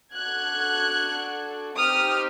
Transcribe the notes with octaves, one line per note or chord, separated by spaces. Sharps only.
D4 F#4 A4 F#6 G#6
C4 D#4 G4 D#6 F6